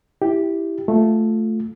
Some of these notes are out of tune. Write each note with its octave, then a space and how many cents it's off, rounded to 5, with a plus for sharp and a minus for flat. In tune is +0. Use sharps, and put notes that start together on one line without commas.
E4 +0 G4 +0
A3 +0 F4 +5